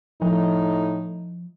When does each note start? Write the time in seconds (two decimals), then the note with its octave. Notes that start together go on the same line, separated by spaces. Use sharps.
0.22 A2 F3 D#4